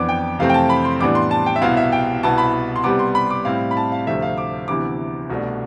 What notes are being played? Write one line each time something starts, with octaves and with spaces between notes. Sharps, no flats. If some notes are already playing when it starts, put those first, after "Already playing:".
Already playing: F2 E3 B3 D4 D6
G5
F2 C3 E3 A3 C4 F5
G5
A5
B5
C6
A2 E3 G3 B3 D4 D6
C6
A5
G5
E5
C2 B2 B3 E4 F5
E5
G5
C2 B2 B3 E4 A5
B5
C6
C3 G3 B3 D6
C6
B5
D6
A2 G3 C4 E4 F5
B5
A5
F5
D2 C3 F3 A3 E5
F5
D6
D2 C3 E3 B3 E4 D6
C2 B2 A3 D4